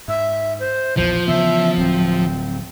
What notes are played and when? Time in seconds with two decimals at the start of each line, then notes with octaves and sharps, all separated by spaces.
0.08 G#2 E5
0.60 C5
0.97 A#1 E2 E3 F3 C5
1.27 C#3 E3 B3 E5
1.77 D1 F#3 C4